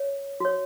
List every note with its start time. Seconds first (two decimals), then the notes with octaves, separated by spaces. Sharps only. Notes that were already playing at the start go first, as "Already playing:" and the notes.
Already playing: C#5
0.40 F#4 C#5